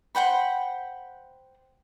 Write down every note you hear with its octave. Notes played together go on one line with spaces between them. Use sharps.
C5 F#5 G5 B5